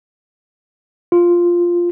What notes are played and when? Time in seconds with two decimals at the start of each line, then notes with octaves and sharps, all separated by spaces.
1.12 F4